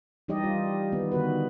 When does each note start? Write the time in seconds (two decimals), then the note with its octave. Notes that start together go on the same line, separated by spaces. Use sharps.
0.28 E3 G3 D#4 G4 D5 D#5
0.44 G3 F4
0.92 D#3 B3
1.12 D3 D#3 F#4 B4